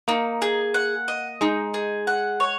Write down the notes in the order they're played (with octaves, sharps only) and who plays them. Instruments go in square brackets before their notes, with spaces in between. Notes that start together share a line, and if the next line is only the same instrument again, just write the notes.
[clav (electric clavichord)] A#3 [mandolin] D#4
[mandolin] G#4
F#5
D#5
[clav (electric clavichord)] G#3 [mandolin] D#4
[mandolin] G#4
F#5
C#5